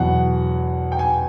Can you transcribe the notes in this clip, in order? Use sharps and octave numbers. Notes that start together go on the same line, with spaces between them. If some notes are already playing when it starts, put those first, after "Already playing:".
Already playing: E2 B2 F#3 B3 F#5
G5
G#5